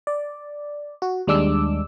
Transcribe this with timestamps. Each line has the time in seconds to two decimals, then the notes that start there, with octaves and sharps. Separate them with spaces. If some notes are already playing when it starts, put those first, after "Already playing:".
0.07 D5
1.02 F#4
1.27 D#2 G3 G#3 D4 D6 E6